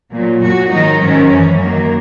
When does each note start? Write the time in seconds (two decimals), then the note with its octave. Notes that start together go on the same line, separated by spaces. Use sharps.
0.14 A#2 F#3
0.42 A#2 F#3 F#4
0.72 G#2 D#3 F#3 D#4
1.01 G#2 D#3 F#3 C#4
1.30 F#2 E3
1.59 F#2 D#3 F#3 A#3